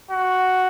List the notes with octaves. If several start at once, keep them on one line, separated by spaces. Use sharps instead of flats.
F#4